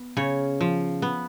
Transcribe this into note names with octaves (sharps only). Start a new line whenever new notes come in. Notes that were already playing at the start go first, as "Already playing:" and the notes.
Already playing: B3
C#3 C#5
F3
B3